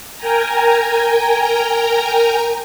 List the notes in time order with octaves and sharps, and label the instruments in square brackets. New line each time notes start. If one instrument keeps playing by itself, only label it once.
[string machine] A#4 G5 G#5 A#5